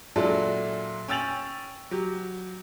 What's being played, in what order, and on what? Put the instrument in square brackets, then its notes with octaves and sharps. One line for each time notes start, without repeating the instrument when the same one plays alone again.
[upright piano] A#2 F#3 G#3 D4 E4 A4
C#4 G5 E6 A6 F7 F#7
F#3 G4